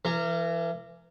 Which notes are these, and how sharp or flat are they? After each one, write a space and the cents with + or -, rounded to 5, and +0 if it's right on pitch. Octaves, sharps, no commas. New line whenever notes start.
E3 +30 A#4 -20